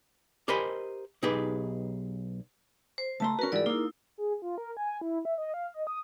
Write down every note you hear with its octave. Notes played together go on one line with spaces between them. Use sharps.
G4 A#4 C5 D#5 G#5 B5
B1 D#4 G4 G#4 B4
C5
C#2 A3 A5 A#5 C6
C#4 F#4 A#4 B4
G#2 E3 G3 G#4 D5
A#3 D#4 E4
G#4
F4
A#4
G#5
E4
E5
D#5
F5
D#5
D#6